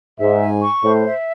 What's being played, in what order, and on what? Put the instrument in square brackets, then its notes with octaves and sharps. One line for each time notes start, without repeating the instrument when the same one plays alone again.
[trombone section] G#2 [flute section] E5
[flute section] G#5
C#6
[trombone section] A2 [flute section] C5
[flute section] E5